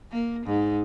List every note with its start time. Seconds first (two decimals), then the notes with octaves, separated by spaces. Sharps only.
0.11 A#3
0.46 G#2